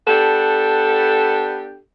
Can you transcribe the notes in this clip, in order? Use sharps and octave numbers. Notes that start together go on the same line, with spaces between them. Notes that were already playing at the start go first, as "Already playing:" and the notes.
B3 D4 G4 A4